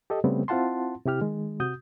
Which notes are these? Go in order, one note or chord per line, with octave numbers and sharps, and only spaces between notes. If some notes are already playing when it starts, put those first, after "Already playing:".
G4 A4 D#5
C#3 G3 A3 B3 C4
C4 E4 F4 F#5 A5 C6
C3 E4 G4 F6
D#3 G#3
C3 F#4 D#6 G6